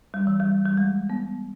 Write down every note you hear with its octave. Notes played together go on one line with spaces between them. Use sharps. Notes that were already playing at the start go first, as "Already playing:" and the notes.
G3
E3
G3
G3
G#3
B3